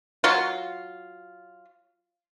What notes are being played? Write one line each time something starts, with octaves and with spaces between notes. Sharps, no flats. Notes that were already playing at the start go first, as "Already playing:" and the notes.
F#3 F4